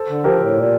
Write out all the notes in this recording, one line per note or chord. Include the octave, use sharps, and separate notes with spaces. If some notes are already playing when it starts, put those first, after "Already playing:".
Already playing: A4 C5
D3
F3 G4 A#4
A2
A#2